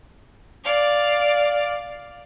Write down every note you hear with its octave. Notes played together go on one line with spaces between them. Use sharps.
D5 F5